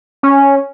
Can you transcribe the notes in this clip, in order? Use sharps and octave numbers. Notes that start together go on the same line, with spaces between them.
C#4